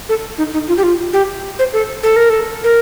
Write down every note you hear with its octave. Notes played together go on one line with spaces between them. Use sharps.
A4
D#4
D#4
F4
G4
F4
G4
C5
A4
A4
A#4
A4
A#4